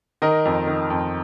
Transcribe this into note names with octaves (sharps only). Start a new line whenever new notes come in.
D#3 A#4 D#5
F2
D#3
F2